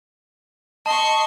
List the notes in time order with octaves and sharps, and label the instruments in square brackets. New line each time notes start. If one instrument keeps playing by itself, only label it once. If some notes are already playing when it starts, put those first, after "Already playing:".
[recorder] D#5 [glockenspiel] A5 [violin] C6 C#6